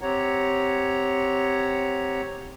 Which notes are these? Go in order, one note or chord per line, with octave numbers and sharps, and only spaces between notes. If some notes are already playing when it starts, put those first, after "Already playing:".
C4 G4 C#5 F#5 A#5